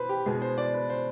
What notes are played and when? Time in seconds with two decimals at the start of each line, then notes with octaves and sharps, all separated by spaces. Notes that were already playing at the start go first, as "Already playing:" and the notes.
Already playing: B2 B4 C5
0.09 G4
0.26 B2 G#3 B3 G#4
0.42 C5
0.58 D5
0.74 B4
0.90 C5